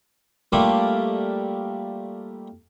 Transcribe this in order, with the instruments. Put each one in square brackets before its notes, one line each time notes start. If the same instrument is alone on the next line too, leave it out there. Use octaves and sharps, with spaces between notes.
[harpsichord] G3 A3 A#3 D4 F4 A4